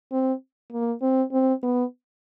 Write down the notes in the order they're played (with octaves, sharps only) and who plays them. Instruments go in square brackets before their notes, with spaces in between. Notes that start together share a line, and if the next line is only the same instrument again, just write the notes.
[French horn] C4
A#3
C4
C4
B3